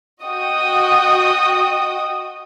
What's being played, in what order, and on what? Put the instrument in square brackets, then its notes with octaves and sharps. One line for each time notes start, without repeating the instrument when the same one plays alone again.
[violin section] F#4 D#5 G5 D#6